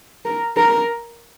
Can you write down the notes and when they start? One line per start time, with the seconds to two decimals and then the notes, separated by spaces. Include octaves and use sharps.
0.25 A#4
0.57 A#4